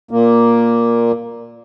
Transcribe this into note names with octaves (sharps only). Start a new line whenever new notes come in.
A#2 A#3